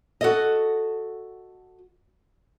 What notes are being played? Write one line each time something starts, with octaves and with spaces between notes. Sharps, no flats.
F#4 A4 D#5